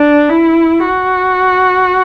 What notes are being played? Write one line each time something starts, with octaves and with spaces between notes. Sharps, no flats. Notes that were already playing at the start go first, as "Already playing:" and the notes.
Already playing: D4
E4
F#4